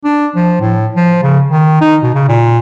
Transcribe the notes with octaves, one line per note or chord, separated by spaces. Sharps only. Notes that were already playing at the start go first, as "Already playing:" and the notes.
D4
F3
A2
F3
C#3
D#3
D#4
B2
C#3
A#2